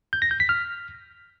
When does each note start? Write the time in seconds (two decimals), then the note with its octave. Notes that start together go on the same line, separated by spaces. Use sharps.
0.13 G6
0.22 A#6
0.31 G6
0.40 B6
0.49 F6